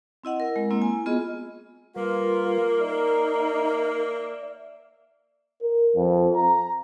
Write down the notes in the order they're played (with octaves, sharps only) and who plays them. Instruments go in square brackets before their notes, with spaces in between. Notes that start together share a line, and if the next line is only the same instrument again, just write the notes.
[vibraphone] C4 E4 D#5 F#5
A#4
G#3
A#3 C4 E4
G#5
B3 F4 G#4 D#5
[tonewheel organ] G3 B4 [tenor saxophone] A#3 [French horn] F4 [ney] A#4
[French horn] D#4 [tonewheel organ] D5 E5
[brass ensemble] A#4
F2
A#5